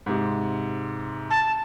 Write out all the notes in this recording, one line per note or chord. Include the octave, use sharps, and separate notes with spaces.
G#2 C3
A5